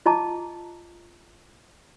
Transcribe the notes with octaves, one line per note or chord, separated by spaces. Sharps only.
F4 D#5 A5 A#5 D6